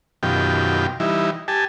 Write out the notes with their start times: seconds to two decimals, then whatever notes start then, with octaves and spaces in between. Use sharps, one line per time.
0.23 F#2 B2 D#3 F4 G4 G5
1.00 E3 G3 D#4 E4
1.48 G4 G#5 A5